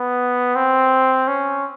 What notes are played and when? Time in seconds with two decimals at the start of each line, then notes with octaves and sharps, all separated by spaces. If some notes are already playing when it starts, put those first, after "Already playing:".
Already playing: B3
0.55 C4
1.27 C#4